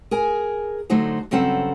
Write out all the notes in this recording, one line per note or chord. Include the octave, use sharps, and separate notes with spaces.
G#4 A#4 G#5
D3 F#3 A3 D#4 F#4 C5
G2 C#3 F#3 C4 A4 F#5